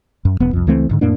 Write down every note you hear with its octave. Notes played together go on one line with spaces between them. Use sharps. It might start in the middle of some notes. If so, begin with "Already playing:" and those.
F#2
E1 B3
C2 F2
C#2 E3 A3 C4
A1 G#2 D3
F2 A2 A#3 D4